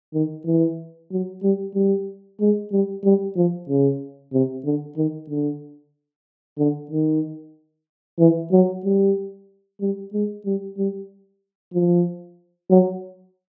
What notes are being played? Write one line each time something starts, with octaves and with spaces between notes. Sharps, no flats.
D#3
E3
F#3
G3
G3
G#3
G3
G3
F3
C#3
C3
D3
D#3
D3
D3
D#3
E3
F#3
G3
G3
G#3
G3
G3
F3
F#3